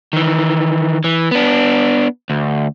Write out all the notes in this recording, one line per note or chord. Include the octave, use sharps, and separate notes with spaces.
D#3 E3
E3
B3 D4
D2